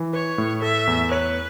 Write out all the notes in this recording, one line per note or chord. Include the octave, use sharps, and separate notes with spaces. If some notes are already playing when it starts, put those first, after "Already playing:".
Already playing: E3
B4 C#5
A2
A4 E5
E2
B4 C#5